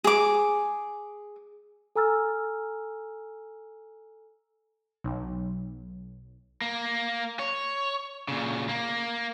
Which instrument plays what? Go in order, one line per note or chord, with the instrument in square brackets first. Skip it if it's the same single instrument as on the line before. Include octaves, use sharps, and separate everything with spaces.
[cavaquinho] G#4 D6
[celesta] A4 G#5 A#5 E6 F6 A6
[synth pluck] B1
[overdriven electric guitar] A#3
C#5
A#2 C#3
A#3